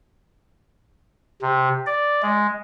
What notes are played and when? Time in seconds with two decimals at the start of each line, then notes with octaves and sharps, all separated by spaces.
1.42 C3
1.86 D5
2.22 G#3